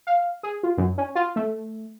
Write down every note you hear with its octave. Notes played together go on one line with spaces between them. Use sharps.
F5
G#4
F4
F#2
C#4
F4
A3